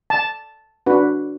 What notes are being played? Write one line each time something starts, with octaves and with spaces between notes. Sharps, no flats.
A5
D4 F#4 B4